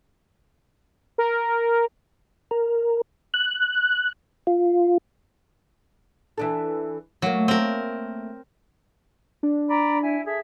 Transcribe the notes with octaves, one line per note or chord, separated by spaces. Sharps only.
A#4
A#4
F#6
F4
E3 D4 A4
F#3 A3 A#3
C4 A#4
D4
D5 A#5 B5
E4 G#5
G#4 A4 E5